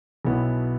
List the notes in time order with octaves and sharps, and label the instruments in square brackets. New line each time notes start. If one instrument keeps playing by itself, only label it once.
[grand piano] B1 B2 F#3 B3 E4